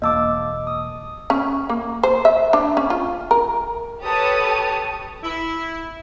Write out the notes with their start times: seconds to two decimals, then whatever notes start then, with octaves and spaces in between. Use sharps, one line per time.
0.02 E1 A#3 D#5 A5 D6 E6
0.67 D#6
1.30 C#4
1.69 A#3
2.03 C5
2.25 E5
2.53 D4
2.77 C#4
2.90 F4
3.31 A#4
4.03 G4 A4 B4 C#5 A5 D#6
5.23 E4